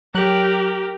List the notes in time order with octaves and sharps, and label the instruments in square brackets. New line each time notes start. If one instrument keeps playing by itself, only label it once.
[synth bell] F#3 F#6 F#7 [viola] G4 A#4